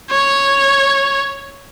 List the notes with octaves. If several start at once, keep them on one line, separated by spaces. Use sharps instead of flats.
C#5